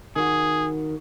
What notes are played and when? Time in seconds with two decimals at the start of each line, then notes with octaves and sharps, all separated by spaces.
0.16 D#3 F#4 G#4